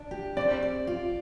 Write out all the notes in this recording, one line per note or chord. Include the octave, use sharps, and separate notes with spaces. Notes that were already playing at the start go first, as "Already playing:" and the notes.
Already playing: D4
G4
C4 D5
D5
F4